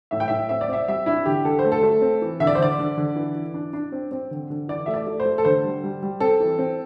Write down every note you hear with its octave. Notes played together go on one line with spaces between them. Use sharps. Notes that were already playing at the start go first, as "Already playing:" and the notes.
A2 E5
G5
A2 E5
C4 E5
D5
C4 E5
G3 E5
D4 E4
D3 G4
D3 A4
C5
A3
A4
A3
C4
E3
D3 E5
D5
C5
D3 D5
D3
D3
E3
E3
D4
D4
C4
C4
D3
D3
E3 D5
A3 E5
D5
A3
C5
A3
A4
D3 C5
G3
G3
G3
C4 A4
E3
C4